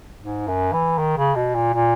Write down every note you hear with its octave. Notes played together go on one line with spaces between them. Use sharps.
G#2
F#2
E3
D#3
C#3
B2
A#2
A#2